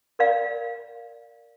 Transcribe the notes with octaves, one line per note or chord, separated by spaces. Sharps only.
A#4 D5 F5